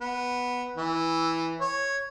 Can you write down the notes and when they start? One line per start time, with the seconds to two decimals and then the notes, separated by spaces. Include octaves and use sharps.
0.01 B3
0.77 E3
1.61 C#5